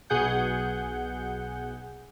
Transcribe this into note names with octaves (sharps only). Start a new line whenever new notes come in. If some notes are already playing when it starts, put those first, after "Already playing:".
B1 B2 G#4 F#5 G6